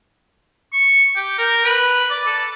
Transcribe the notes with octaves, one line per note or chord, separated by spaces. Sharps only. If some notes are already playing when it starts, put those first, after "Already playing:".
C#6
G4
A#4
B4
D5
A4